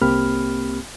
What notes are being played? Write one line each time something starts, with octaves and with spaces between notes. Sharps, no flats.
C2 A#3 C4 G4 B5 F6